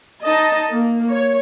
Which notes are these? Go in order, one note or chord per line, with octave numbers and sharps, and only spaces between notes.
D#4 D#5 A5
A#3
C#5